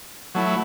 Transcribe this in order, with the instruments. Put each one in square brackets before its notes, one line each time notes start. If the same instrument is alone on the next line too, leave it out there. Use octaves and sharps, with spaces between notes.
[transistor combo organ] F#3 A3 E4